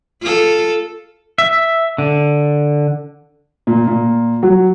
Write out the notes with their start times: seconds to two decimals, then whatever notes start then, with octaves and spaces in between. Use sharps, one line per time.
0.22 F4 A4
1.38 E5
1.98 D3
3.67 A#2
3.87 A#2
4.43 F#3